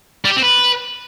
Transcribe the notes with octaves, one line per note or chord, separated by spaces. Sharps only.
G3
G4
C4
B4